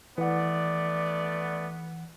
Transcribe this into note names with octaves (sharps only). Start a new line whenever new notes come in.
E3 A3 B3 D5 F#5